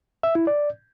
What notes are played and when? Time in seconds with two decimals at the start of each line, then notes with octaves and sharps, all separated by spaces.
0.23 E5
0.35 E4
0.47 D5